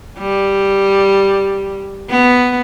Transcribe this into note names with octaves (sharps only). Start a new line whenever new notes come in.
G3
B3